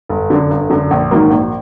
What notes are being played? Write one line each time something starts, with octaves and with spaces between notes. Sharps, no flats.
G1
F#2 D3
G1
F#2 D3
A#1
G#2 D#3 F#3 A#3
A#1